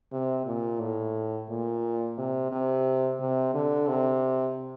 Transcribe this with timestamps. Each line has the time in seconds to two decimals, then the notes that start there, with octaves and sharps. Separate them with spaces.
0.13 C3
0.47 A#2
0.81 A2
1.50 A#2
2.18 C3
2.52 C3
3.20 C3
3.54 D3
3.88 C3